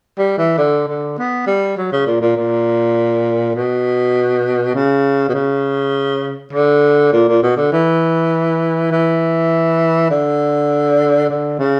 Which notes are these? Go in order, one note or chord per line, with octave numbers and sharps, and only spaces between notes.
G3
E3
D3
D3
B3
G3
F#3
C#3
A#2
A#2
A#2
B2
C#3
B2
C#3
D3
A#2
A#2
B2
D3
E3
E3
D3
D3
C#3